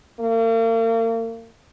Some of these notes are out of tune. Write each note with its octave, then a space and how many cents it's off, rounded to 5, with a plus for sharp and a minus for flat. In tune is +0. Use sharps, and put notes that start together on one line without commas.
A#3 -40